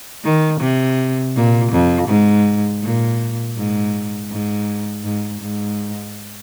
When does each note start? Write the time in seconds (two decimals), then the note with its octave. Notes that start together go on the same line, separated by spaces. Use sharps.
0.24 D#3
0.60 C3
1.35 A#2
1.72 F2
2.08 G#2
2.83 A#2
3.56 G#2
4.30 G#2
5.04 G#2
5.41 G#2